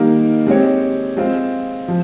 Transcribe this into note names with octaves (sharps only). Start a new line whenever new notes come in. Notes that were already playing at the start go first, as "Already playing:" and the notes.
Already playing: D#3 G3 A#3 D#4 A#4
G#3 C4 G4 C#5
G#3 C4 F4 C5
F3